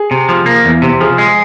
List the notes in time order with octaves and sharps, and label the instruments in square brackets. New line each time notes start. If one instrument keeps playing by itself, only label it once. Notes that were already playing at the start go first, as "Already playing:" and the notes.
Already playing: [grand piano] G#4
[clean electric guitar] C3
F3
A#3
E2
C3
[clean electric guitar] F3 [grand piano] G#4
[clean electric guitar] G#3